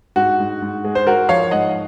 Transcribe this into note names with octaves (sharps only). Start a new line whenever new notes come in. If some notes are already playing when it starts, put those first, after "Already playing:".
G#2 F#4
G#2
G#2
G#3
C5
G#3 F#4 A#4
F3 C#5 F5
G#2 D#5 F#5